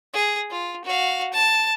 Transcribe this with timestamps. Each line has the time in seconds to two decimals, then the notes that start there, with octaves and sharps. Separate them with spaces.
0.14 G#4
0.51 F4
0.85 F#4 F5
1.33 A5